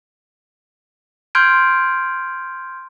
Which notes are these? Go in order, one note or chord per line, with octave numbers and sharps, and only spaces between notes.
C6 F6 G6 G#6 D7